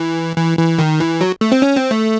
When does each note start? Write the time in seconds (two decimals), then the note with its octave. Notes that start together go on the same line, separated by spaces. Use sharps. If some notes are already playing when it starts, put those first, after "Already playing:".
Already playing: E3
0.37 E3
0.59 E3
0.79 D#3
1.00 E3
1.21 F#3
1.41 A3
1.52 C4
1.62 C#4
1.76 C4
1.91 A3